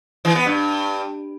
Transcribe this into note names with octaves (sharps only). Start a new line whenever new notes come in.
E3
B3
G2